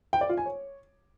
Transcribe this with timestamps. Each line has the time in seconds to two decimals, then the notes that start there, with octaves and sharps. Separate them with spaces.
0.13 G5
0.21 D5
0.29 F4
0.38 G#5
0.46 C#5